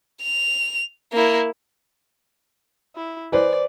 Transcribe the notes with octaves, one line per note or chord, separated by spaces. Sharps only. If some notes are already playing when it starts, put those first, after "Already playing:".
F7
A#3 E4
E4
E3 B4 C5 D5 D#5